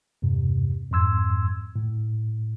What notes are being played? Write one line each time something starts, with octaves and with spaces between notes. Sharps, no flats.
E2 G2 C3
F2 G#2 C6 E6 G#6
A2